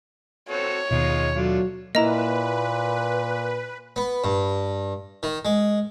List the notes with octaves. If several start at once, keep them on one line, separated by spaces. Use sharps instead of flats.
C4 F#4 A4 C#5
D#2 B2 G#3 D#4 F4
F#3 A3 D4 F4
A#2 A#3 E4 B4 D#5 A#5
B3
G2
D#3
G#3